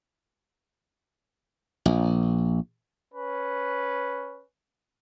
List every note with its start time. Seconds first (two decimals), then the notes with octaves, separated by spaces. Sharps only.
1.86 A#1
3.13 C#4 B4